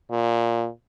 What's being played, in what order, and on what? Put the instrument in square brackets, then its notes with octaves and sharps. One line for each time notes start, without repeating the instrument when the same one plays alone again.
[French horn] A#2